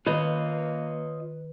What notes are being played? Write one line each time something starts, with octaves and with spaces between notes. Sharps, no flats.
D#3 A#3 F4 B4 C#5 D#5